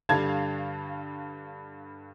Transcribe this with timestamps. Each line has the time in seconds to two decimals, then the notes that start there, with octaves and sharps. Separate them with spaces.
0.09 G2 D3 G3 F5 A5 G#6